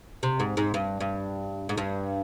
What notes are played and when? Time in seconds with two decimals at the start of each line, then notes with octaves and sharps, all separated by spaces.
0.23 C3
0.40 G#2
0.57 G#2
0.74 G2
1.00 G2
1.69 G#2
1.78 G2